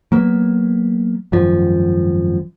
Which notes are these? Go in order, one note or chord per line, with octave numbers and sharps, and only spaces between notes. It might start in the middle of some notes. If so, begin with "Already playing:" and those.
F#3 A#3 B3
G#1 F#2 F3